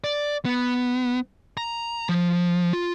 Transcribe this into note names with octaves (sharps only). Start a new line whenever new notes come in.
D5
B3
A#5
F3
F4